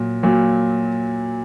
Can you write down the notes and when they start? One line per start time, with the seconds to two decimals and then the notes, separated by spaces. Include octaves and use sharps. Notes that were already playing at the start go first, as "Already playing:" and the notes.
Already playing: A#2 F#3
0.23 A#2 F#3